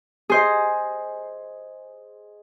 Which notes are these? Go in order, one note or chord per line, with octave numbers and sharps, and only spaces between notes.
G#4 C5 D#5